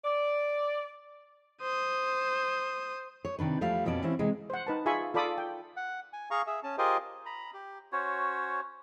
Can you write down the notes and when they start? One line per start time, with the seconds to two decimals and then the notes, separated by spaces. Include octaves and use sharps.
0.05 D5
1.62 C5 D#6
3.25 C#5
3.39 C3 D#3 D4 B4
3.61 E2 F3 G3 A3 G4 F5
3.85 F2 B2 B3 C#4 D5 A5
4.02 E3 G3 C4 C#4 E4
4.19 C3 E3 G#3
4.50 C5 F#5
4.67 D#4 B4 A5
4.86 F4 G#4 E5 G#5 B5 C#6
5.14 F4 A4 D5 B5 D6 D#6
5.38 G5
5.77 F#5
6.13 G#5
6.31 G#4 F5 A#5 C#6
6.47 G#4 E5
6.63 C#4 A5
6.78 F4 G4 G#4 A#4 C5 D#5
7.26 A#5 B5
7.54 G4
7.92 C#4 F#4 C5 C#5